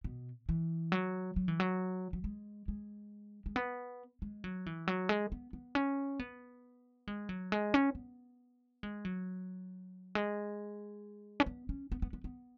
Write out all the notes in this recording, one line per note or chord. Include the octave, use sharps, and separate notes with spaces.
B2
E3
F#3
F#3
E3
F#3
F#3
G#3
G#3
G#3
B3
G#3
F#3
E3
F#3
G#3
B3
B3
C#4
B3
G#3
F#3
G#3
C#4
B3
G#3
F#3
G#3
C#4
B3
C#4
B3
B3
B3
B3